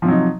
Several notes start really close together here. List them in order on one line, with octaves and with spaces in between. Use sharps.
F3 C3 F#3 D#4